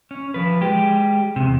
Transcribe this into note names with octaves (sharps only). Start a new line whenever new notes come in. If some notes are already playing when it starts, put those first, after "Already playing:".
C#4
F3 B4
G#3 G4
E2 C3